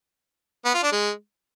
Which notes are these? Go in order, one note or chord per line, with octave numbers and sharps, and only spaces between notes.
B3
F4
D4
G#3